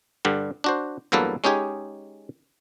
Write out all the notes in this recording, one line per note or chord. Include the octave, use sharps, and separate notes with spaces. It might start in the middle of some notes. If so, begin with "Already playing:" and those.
G2 D3 G3
D4 F#4 C5
E2 G2 F#3 A#3 A4 B4
G#3 C#4 D#4 G4 G#4